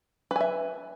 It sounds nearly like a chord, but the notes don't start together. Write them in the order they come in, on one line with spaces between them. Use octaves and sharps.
B4 G#5 E5